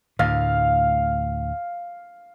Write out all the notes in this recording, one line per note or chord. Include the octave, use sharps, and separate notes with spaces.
D2 A2 F5